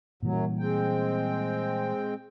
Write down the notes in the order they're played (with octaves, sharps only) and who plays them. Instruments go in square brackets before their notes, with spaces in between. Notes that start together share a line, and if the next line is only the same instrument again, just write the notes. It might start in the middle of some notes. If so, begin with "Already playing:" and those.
[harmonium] F#2 F#3 [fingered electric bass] A#2 E3 G3
[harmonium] G#3 C4 G5